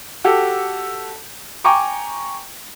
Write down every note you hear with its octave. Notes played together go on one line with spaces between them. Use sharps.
F#4 G4 A4
G5 G#5 A#5 C#6 D6